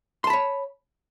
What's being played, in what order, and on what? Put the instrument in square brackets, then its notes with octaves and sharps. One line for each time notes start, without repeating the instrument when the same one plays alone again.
[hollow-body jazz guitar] C6
A5
B5
C#5